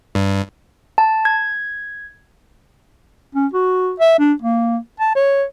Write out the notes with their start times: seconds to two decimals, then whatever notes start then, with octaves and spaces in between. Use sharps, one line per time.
0.15 G2
0.98 A5
1.25 G#6
3.35 C#4
3.53 F#4
4.00 E5
4.19 D4
4.42 A#3
5.00 A5
5.15 C#5